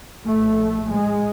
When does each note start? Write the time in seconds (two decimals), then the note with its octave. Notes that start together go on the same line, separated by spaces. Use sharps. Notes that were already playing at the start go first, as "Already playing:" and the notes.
0.23 A#1 A2 A3
0.90 G#3